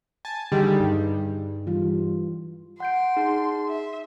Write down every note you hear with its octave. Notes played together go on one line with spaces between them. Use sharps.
G#5 A5
D3 D#3 G3 G#4
G2 D#4
E3 G3 F4
F#5 C6 G6 D7
D#4 G#4
E5